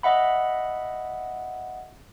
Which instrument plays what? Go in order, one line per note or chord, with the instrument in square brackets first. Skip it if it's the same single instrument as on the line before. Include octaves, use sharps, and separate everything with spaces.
[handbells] D#5 E5 F#5 B5